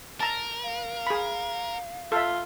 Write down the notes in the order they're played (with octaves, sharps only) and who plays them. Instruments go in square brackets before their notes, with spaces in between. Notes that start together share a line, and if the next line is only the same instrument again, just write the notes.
[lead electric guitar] A#4 [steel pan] A5 A#5
[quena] F5
[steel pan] G#4 B5
[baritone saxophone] F4 [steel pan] A4 E5